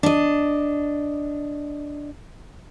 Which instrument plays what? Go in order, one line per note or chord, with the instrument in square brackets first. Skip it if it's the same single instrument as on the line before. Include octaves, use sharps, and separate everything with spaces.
[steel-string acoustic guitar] D4 D#5